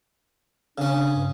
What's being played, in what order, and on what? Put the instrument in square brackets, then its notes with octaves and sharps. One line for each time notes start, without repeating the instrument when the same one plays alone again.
[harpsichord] C#3 C#4 [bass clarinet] D4
[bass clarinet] G2